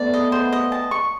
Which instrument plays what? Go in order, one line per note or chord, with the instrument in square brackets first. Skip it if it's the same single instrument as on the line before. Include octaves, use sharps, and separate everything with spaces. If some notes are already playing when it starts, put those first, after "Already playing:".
Already playing: [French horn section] A3 B3 [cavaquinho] D5
[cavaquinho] D#5
C5
D#5
A5
C#6